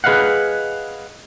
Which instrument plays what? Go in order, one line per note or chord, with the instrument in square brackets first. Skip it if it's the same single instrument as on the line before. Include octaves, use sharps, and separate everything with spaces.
[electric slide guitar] G#4 B4 D#5 F5 F#5